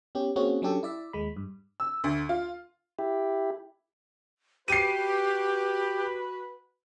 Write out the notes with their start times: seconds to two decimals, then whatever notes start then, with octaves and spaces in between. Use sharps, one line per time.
0.15 B3 C#4 G4
0.36 A#3 C4 C#4 F#4 G#4
0.62 F#3 C#4 D4 G4 A4
0.83 E4 D5 E5
1.13 D#2 G#3 B5
1.36 G2
1.80 E6
2.04 D2
2.29 F4
2.99 E4 G4
4.68 F#4 G4 B4 C7 D#7